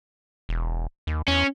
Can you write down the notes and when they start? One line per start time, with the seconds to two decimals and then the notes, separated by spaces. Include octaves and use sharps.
0.49 E1
1.07 D#2
1.28 E2 C#4